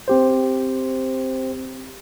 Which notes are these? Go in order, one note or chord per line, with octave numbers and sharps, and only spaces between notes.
C4 G4 C5